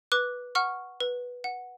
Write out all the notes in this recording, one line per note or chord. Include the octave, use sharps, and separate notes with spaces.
B4 D6 F#6
F#5 C#6 F6
B4
F#5